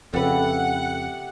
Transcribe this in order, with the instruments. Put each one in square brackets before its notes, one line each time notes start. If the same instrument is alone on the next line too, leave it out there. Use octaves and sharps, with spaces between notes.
[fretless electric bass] F2 C#3 [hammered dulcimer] G4 E5 [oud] A4 B4 [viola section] F#5